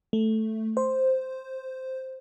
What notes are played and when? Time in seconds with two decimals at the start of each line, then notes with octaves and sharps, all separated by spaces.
0.13 A3
0.77 C5